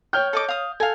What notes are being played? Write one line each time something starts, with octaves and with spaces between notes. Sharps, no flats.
C#5 G5 F6 G6
A4 D#5 D6
F5 D#6
A4 F5 G#5